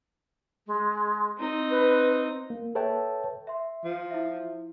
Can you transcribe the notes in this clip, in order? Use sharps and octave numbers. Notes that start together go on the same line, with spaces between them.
G#3
C4 D#4
B4
A#3
A4 B4 C#5 E5 G5 A5
E5 C6
F3
E4 E5